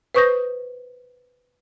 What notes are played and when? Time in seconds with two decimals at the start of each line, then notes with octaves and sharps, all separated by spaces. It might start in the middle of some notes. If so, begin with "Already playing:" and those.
0.14 B4 C5 C#6 D#6 G6 A#6